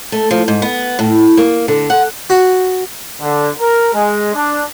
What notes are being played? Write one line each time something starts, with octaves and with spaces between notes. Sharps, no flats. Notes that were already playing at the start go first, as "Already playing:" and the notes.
A3
F3
G#2
B3
A2
A#3
D3
F#5
F#4
D3
A#4
G#3
D4